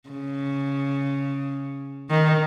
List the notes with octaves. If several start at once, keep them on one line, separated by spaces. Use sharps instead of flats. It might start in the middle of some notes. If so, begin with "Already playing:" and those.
C#3
D#3